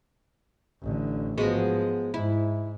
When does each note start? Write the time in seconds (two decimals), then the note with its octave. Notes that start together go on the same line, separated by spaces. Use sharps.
0.82 A1 D3
1.38 G#2 F3 G#3 B3 F#4
2.14 G#2 E4